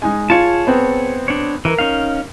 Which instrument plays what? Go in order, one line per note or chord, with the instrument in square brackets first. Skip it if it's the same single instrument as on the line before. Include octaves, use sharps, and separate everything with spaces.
[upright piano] G#3 D#4 G#5
[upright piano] F4 [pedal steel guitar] G#4 C#5 A5
[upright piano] B3 C4
[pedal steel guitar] D4 C#5
[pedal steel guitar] E3 [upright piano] A#4
[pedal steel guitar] C#4 D#4 F5